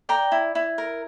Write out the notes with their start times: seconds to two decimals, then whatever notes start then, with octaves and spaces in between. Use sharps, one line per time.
0.09 D5 G5 A#5
0.32 E4
0.55 E4
0.78 A#4